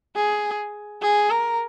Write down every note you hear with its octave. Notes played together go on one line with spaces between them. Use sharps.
G#4
G#4
A#4